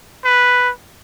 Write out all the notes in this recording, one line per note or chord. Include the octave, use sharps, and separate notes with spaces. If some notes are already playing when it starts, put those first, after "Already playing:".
B4